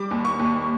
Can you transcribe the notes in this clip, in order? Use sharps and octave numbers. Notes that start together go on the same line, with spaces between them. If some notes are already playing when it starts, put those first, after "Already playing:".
Already playing: G3 D6
D#2
C#6
D#2